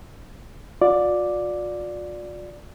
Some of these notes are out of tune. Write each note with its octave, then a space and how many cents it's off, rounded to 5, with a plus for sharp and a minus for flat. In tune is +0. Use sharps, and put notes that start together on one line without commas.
F4 +45 D5 +0